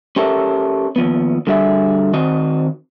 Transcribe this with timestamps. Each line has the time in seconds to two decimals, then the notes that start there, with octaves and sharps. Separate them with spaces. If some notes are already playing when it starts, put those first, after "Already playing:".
0.16 C#4 G4 A4 A#4 E5
0.96 D#2 F3 B3
1.47 D3 G3 F#4 G#4 D5 E5
2.13 D#3 C4 F#4 D#5